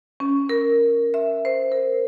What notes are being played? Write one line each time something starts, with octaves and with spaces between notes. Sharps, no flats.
C#4
A#4
E5
C5
A#4